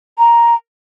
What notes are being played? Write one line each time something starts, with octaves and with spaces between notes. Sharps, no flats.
A#5